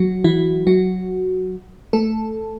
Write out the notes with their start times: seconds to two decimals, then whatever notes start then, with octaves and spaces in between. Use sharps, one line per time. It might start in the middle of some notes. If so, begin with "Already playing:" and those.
Already playing: F#3 F#4
0.24 E3 E4
0.67 F#3 F#4
1.93 A3 A4